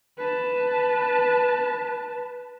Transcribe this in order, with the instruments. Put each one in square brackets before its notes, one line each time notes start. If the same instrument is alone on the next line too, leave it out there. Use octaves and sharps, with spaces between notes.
[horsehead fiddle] B4 A5